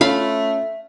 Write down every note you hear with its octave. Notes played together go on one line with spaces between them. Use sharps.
A3 C#4 F4 E5 F5 B5